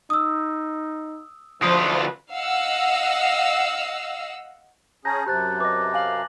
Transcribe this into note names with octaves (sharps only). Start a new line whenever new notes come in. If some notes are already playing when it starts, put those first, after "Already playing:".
D#4 D#6 E6
D2 F3 F4 B4 C5 D#6
D#5 F5 F#5 E6
C#4 G#4 A5 A#5 G6 A#6
F#2 C3 G4 C5 A5 A#5 F#6 A6
B4 D#5 D6 A#6
F5 G#5 F#7